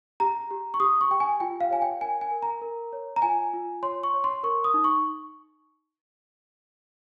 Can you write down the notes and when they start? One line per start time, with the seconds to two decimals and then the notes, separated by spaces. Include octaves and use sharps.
0.20 G4 A#5
0.51 G4
0.74 C#6
0.80 G4 D#6
1.01 C#6
1.11 G4 G5
1.20 G#5
1.40 F4 G5
1.60 F5
1.71 C#5 G#5
1.82 G5
2.01 A#4 G#5
2.21 G#5
2.31 A#4
2.42 A#5
2.62 A#4
2.93 C#5
3.16 A#5
3.22 F4 G#5
3.54 F4
3.83 C#5 C6
4.03 C#6
4.14 C#5
4.24 C6
4.43 A#4 C#6
4.64 D#6
4.74 D#4
4.84 C#6